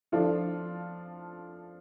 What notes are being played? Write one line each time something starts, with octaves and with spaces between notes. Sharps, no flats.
F3 D4 F4 A4